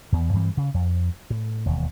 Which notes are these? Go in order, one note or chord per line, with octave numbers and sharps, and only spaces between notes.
E2 E3 B3
G2 E3 G3 C4
C#3
F2
A2
E1 D#2